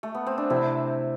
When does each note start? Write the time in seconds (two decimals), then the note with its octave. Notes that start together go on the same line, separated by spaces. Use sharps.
0.03 A3
0.15 B3
0.27 C4
0.38 D4
0.50 C3 E4